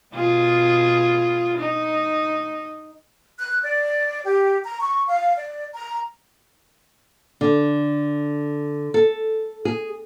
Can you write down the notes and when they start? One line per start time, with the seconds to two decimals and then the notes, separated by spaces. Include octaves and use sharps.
0.14 B2 F4 G#4
1.58 D#4
3.38 F#6
3.62 D5
4.24 G4
4.64 A#5
4.80 C#6
5.08 F5
5.37 D5
5.75 A#5
7.41 D3
8.94 A4
9.65 G#4